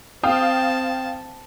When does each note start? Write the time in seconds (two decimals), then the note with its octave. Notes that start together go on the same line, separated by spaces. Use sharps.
0.23 C4 F5 G5 A5 D#6